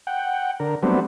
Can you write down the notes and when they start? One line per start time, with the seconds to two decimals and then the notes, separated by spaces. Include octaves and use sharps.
0.07 F#5 G5
0.60 D3 A#4
0.83 F#3 G3 A3 B3 C4 D4